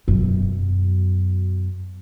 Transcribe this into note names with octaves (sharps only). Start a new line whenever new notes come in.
F#2 B2